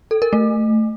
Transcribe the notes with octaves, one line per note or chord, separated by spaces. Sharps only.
A4
A#4
A3